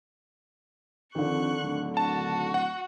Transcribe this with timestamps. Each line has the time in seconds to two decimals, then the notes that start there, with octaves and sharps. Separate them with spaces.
1.15 F2 D3 D#3 C#6 F#6
1.64 D1
1.97 F#4 A5
2.54 F#5